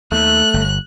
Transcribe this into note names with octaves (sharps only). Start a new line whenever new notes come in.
D#2 A3 F#6
G1